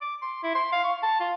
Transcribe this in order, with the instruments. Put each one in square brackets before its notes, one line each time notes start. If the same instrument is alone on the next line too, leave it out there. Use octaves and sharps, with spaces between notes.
[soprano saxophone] D6
C6
E4
C6
F5
C#6
A5
F4